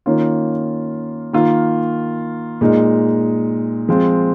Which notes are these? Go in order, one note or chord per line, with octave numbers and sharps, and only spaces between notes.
D#3 A#3 C#4 F4
D#3 A#3 F4
A#2 G#3 D#4
F3 G#3 C4 F4